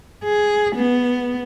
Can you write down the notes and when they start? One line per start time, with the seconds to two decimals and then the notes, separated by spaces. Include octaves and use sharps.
0.24 G#4
0.76 B3